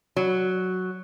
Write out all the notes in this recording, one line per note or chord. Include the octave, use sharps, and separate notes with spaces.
F#3